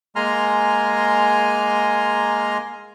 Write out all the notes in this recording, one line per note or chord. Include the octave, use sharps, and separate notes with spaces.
G#3 A#3 G#5 A#5 C6 F6